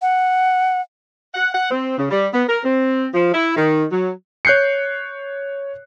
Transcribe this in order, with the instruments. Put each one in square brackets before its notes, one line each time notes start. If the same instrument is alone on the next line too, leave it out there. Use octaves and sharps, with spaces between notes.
[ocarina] F#5
[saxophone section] F#5
F#5
C4
C#3
G3
B3
A#4
C4
F3
E4
D#3
F#3
[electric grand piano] C#5 F#6 G6 C7 C#7